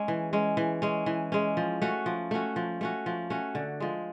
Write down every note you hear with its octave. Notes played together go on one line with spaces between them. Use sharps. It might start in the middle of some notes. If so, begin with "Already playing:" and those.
Already playing: G#3 C#4
E3
G#3 C#4
E3
G#3 C#4
E3
G#3 C#4
F3
A3 C#4 F#4
F3
A3 C#4 F#4
F3
A3 C#4 F#4
F3
A3 C#4 F#4
D3
F3 G#3